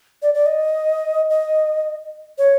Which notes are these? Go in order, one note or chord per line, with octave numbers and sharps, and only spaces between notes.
D5
D5
D#5
D#5
C#5